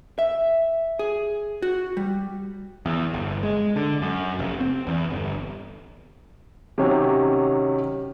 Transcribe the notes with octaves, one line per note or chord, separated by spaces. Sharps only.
E5
G#4
F#4
G3
E2
G1
G#3
D3
F#2
F1
C4
E2
G1
C3 D#3 F#3 C#4 G4